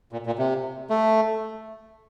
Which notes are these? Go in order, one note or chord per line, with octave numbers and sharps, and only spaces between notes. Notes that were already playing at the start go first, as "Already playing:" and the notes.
A#2
A#2
C3
A3